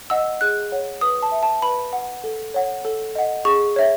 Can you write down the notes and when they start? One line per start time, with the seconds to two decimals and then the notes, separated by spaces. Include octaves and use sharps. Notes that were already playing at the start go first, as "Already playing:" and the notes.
0.10 D#5 F#5 E6
0.41 G#4 F#6
0.72 C#5 F#5
1.01 B4 D#6
1.22 A5
1.32 E5
1.43 A5
1.62 B4 B5
1.93 F#5
2.24 A4
2.54 C#5 F#5
2.85 A4
3.15 D#5 F#5
3.45 G#4 C#6
3.76 C#5 E5